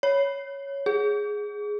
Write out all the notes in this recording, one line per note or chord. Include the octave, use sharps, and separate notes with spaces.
C#5
G#4